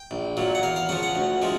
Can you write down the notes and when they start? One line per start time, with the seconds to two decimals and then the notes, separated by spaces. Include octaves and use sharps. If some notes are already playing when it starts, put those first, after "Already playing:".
Already playing: G5
0.11 A#1
0.37 A#2 F#3
0.55 F#5
0.63 E2 F5
0.76 F5
0.89 C#3 F3 F#5
1.03 F#5
1.15 D2
1.42 C3 F3 G#3